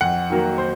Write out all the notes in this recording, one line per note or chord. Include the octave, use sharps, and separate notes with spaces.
F2 F#5
D#3 F#3 A#3
C5